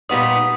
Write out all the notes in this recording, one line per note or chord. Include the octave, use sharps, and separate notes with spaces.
A#2 G3 B3 D#4 D#6